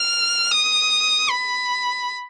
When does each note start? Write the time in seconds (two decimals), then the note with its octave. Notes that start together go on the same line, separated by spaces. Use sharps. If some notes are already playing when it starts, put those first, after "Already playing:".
Already playing: F6
0.51 D#6
1.30 B5